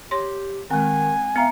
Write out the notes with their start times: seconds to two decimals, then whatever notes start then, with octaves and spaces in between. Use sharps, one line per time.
0.11 G4 C#5 C6
0.70 D#3 G#3 C4 F#5 G#5 F#6
1.36 B3 E5 F5 A#5 C#7